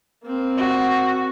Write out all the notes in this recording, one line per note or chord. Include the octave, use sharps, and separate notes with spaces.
A#3 C4
F#4